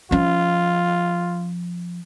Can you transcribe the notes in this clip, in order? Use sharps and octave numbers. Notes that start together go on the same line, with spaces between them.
F3 C#4 F4